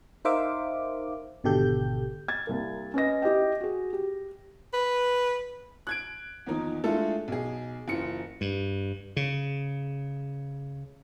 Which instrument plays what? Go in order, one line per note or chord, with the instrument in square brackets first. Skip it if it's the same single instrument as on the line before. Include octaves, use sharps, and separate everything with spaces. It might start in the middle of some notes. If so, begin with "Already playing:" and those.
[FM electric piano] D#4 A#4 C5 E5 F5 D6
G#1 B2 D3 G4 A4 G6
[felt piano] G#6 A6
C2 A#3
C#4 B4 D#5 A#6
E4 G4 D#5 G5
F#4 G#4
G4
[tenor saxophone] B4
[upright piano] F#6 G#6 D7
E2 D#3 F3 A#3 D#4
G#3 A3 D4 E4 F4 A4
B1 G#4
F#1 E3 F4 C#7
[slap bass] G2
C#3